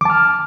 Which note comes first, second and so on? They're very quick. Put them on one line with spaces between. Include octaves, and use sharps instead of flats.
D6 A5 F6